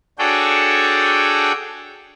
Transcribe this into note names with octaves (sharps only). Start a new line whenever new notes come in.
D4 F#4 G#4 A4 C#5 G5